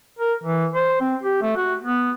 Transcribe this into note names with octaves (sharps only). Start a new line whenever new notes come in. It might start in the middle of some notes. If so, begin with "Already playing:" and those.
A#4
E3
C5
C4
G4
A3
F#4
B3